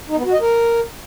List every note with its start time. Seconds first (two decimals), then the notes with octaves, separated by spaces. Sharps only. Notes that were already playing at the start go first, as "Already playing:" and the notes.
0.09 D#4
0.17 B3
0.25 F#4
0.33 D#5
0.41 A#4